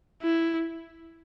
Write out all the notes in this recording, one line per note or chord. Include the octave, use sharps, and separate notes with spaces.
E4